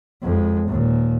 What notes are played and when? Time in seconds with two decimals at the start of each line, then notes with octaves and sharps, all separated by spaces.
0.23 F2 G#3
0.68 D#2 A#2